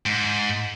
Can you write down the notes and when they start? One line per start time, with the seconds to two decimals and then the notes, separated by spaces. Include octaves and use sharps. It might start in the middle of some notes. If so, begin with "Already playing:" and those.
0.06 G#2